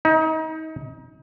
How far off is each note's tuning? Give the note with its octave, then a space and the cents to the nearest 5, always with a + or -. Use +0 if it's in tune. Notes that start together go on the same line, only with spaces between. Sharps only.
D#4 +30